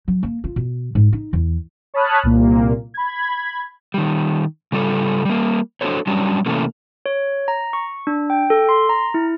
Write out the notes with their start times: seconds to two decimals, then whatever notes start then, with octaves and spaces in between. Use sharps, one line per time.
0.08 F#3
0.23 A#3
0.44 F4
0.56 B2
0.95 G#2
1.13 D#4
1.33 E2
1.94 C#5 A5 B5 D#6 F6 F#6
2.23 C2 A#2 A#3
2.94 B5 G#6
3.94 D#3 G3
4.72 C#3 G3 F4 A4
5.25 G3 A#3
5.81 D4 F#4 G#4 A4 C5 C#5
6.07 F#3 G3 C#4 D4
6.46 C3 E3 A3 A#3 C#4
7.06 C#5
7.48 A#5
7.73 C#6
8.07 D4
8.30 G5
8.50 A4
8.69 C6
8.89 A#5
9.14 E4